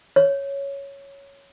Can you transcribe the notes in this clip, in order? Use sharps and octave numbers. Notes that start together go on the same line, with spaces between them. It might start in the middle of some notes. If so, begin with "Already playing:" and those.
C#5